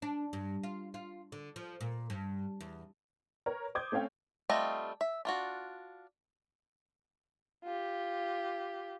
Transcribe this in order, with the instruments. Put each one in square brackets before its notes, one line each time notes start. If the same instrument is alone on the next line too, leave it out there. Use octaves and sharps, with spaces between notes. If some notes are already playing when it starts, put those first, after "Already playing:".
[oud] D4
G2
F4
F4
D3
F3
A#2
G2
E2
[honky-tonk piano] A#4 B4 C#5
C5 D6 D#6 G6 G#6
A3 C4 C#4 F5 G5
[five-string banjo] G3 A3 C4 F4 D#5
E5
D4 F4 F#4
[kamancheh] F4 G4